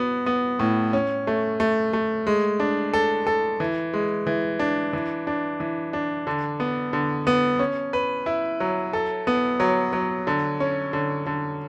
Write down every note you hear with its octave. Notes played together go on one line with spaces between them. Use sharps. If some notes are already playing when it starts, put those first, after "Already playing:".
Already playing: B3 F#4
B3
A2
C#4
A3
A3
A3
G#3
D4
A4
A4
E3
G#3
E3
D4
E3
D4
E3
D4
D3
B3
D3
B3
C#4
B4
E4
F#3
A4
B3
F#3
F#3
D3
C#4
D3
D3